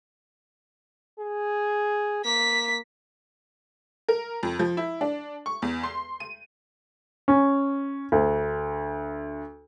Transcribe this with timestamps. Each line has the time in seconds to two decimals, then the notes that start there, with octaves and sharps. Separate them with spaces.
1.19 G#4
2.25 A#3 B6
4.08 A#4
4.43 F2
4.59 F3
4.77 E4
5.01 D4
5.46 C#6
5.62 E2
5.83 C6
6.20 D#7
7.28 C#4
8.12 D2